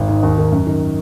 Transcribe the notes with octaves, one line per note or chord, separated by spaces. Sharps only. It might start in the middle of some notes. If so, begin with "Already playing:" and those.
Already playing: G#1
G#2
D#2
D#3
F#2
D#3